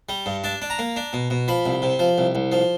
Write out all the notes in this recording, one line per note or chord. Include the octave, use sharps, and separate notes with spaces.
G3
G2
D4 A5
D4
A#5
A#3
D4
B2
B2
F3 B5
C2
C3
F3
C2
C2
F3